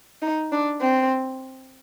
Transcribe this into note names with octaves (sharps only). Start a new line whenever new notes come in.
D#4
D4
C4